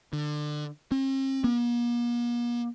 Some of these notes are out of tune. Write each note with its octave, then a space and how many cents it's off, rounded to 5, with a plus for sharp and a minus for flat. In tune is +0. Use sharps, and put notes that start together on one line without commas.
D3 +25
C4 +45
A#3 +45